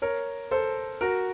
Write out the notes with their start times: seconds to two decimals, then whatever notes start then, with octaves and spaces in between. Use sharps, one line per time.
0.02 A#4 C#5
0.51 A4 C5
1.01 F#4 A#4